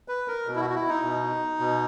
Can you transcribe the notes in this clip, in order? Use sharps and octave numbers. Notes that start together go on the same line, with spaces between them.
B4
A#4
B2
E4
F#4
F#4
E4
D#4
B2
B2